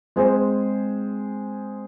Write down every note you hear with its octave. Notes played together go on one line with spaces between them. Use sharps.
G#3 C4 G#4 C5